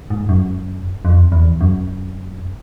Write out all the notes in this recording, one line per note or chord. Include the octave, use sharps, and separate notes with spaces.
G#2
F#2
F2
E2
F#2